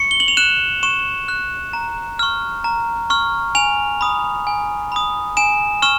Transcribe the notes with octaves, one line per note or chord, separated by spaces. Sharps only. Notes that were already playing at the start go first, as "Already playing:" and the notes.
Already playing: C#6 C#7
G7
F#7
F7
F#6 E7
C#6 E7
F#6
A#5
C#6 F6
A#5
C#6 F6
G#5 F7
B5 D#6
G#5
B5 D#6
G#5 E7
C#6 F6 E7